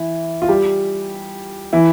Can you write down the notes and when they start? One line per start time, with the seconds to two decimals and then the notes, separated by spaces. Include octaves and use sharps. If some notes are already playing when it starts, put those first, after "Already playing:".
Already playing: E3 E4
0.42 F4
0.49 G3 G4
1.73 E3 E4